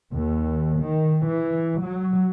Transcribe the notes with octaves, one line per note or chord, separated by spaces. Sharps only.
D#2
D#3
E3
F#3